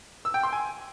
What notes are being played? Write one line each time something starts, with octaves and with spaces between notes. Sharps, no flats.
E6
G5
C6
G#5